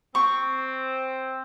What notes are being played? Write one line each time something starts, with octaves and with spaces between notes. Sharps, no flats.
C4 C#6